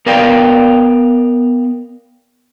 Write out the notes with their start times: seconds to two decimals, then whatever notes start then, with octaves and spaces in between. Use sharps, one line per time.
0.06 B3 A#4 B4 D5 F5 G5